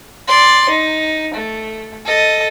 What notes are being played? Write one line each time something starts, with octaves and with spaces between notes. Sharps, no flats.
D5 C6
D#4
A3
A4 D#5